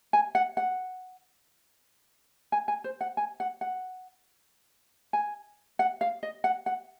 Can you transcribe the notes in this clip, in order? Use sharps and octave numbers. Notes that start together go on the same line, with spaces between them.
G#5
F#5
F#5
G#5
G#5
C5
F#5
G#5
F#5
F#5
G#5
F#5
F5
D#5
F#5
F#5